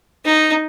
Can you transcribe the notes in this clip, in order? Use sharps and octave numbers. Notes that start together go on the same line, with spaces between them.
D#4